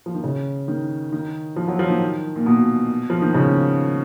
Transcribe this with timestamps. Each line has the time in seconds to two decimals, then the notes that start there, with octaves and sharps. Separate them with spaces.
0.06 F3
0.15 D#3
0.24 C#3
0.68 D#3
1.12 D#3
1.56 F3
1.68 F#3
1.79 F3
1.90 D#3
2.36 A#2
2.46 B2
3.10 F3
3.22 D#3
3.35 C#3